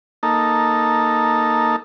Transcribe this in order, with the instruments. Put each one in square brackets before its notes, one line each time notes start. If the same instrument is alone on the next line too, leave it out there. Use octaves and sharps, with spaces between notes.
[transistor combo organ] A#3 D#4 A4